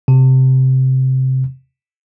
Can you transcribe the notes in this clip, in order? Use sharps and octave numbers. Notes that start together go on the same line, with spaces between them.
C3